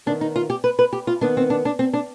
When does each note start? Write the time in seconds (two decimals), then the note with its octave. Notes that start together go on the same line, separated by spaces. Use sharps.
0.06 D#3 B3 D4
0.21 D#4
0.36 F4
0.50 G4
0.64 B4
0.79 B4
0.93 G4
1.07 F4
1.21 D#3 B3 D4
1.37 C4
1.50 D4
1.65 D4
1.79 C4
1.93 D4